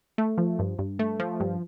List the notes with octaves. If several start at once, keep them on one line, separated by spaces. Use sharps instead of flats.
A3
F3
G2
G2
A3
F3
G2